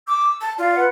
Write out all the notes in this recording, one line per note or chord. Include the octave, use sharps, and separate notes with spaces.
D6 E6
A5
F4 D5 F5
B4 F#5